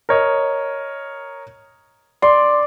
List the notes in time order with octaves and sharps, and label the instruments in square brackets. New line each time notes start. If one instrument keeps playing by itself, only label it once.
[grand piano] A#4 C#5 D#5
[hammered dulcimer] D5 [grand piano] C6